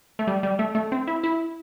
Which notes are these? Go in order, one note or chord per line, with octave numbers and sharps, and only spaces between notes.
A3
G3
G3
A3
A3
C4
E4
E4